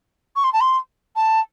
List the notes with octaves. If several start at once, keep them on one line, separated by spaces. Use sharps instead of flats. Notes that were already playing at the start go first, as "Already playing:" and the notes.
C#6
C6
A5
C6
A5